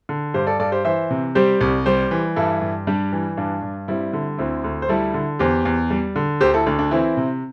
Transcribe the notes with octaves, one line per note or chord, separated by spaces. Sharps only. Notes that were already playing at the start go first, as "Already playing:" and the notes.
D3
G2 G4 C5
A4 D5
G2 A4 D5
G4 C5
E3 C5 E5
C3
G3 G4 C5
C2
G3 G4 C5
E3
G2 E4 A4
G2
G3 D4 G4
E3
G2 D4
G2
G3 C4 E4
D3
D2 C4 E4
D2
C5
G3 E4 A4
D3
E2 G4 C5
E2
G3
D3
D2 G4 C5
E4 A4
D2 D4
D4
E3 C4 E4
C3